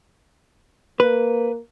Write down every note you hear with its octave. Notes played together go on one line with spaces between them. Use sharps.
A#3 B4